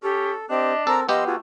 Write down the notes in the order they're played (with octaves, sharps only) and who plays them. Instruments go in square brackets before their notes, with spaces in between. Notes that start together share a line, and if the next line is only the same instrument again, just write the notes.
[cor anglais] C#4 [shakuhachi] G4 [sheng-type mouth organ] A4
[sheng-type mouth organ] C4 G4 [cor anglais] D4 [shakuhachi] D#5
[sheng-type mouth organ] C4 A#4 [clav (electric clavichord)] A4 [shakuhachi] A#5
[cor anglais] F3 [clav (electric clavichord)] B3 G4 [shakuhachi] D#5 [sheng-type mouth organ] F5 C6 E6
[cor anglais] A3 [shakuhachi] F4 [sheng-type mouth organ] F#4 G#4